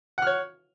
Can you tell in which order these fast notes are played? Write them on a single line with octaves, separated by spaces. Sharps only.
F#5 F6 C#5